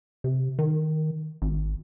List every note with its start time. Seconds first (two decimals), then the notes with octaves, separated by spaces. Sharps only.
0.24 C3
0.59 D#3
1.42 G#1